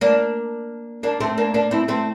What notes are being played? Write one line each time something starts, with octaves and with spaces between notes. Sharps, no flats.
A#3 D4
A#3 D4
A3 C4
A#3 D4
A#3 D4
C4 E4
A3 C4